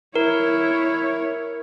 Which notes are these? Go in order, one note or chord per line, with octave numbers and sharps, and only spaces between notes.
E4 A#4 C#5